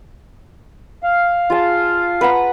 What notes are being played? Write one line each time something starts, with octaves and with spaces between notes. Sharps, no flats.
F5
F4 G#4 A5
B4 F#5 A#5